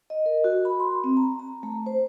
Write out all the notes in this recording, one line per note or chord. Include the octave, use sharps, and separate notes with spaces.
D#5
A#4
F#4
B5
C6
C4
A#5
A#5
A3
C5